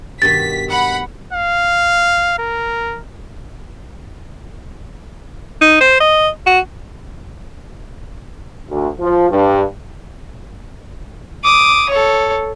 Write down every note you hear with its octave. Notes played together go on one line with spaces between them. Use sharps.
G2 B2 D#3 A6 B6
F#5 B5
F5
A#4
D#4
C5
D#5
F#4
D2
F3
G2
D6 D#6
A4 C#5